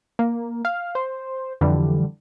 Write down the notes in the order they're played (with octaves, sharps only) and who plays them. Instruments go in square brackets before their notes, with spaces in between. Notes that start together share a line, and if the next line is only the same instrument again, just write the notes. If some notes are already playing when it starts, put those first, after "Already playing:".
[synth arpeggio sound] A#3
F5
C5
F2 D3 E3 G3